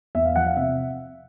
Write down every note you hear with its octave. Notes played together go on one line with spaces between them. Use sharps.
E2 E5
F5
F3 F#5
F5
C3 E5